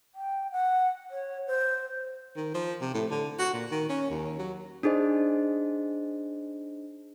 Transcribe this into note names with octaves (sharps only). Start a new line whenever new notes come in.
G5
F#5
C#5
C5
D#3
F3
C3
A2
D3
F#4
A#2
D#3
C#4
D#2
F#3
D4 D#4 G#4 C5 D#5